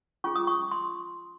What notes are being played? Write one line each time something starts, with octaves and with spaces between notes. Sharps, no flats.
C#4 F4 G#4 C#6
D#6
C#6
C6